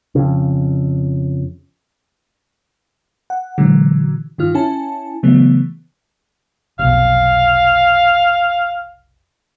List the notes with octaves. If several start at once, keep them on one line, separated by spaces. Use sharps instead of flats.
F2 C#3
F#5
A#2 D3 E3 F#3 G#3
G2 D#3 F4 F6
C#4 E4 G#5 A5
C#3 E3 F#3 A3 B3
F1 B1 F5